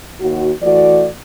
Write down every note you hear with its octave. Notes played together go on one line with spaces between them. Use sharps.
D#2 F#4
E3 A3 F#4 D5